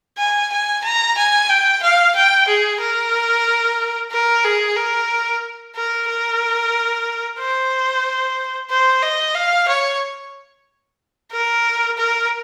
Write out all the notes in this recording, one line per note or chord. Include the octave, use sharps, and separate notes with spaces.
G#5
G#5
A#5
G#5
G5
F5
G5
G#4
A#4
A#4
G#4
A#4
A#4
A#4
C5
C5
D#5
F5
C#5
A#4
A#4